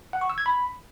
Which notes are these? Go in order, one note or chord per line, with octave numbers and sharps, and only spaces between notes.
F#5
C#6
E6
G#6
B5